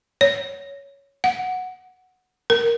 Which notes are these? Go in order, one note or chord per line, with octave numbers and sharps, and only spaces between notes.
C#5
F#5
A#4